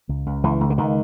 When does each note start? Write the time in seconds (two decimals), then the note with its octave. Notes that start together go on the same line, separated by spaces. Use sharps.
0.09 C#2
0.26 C#2
0.44 C#2 E3
0.61 C#2
0.70 D3
0.78 C#2 D#3